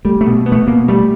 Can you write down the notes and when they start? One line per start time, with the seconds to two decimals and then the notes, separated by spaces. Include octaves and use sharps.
0.05 G3 A3
0.21 A3
0.26 B2
0.46 B3
0.52 A3
0.67 B2 A#3
0.88 G3 A3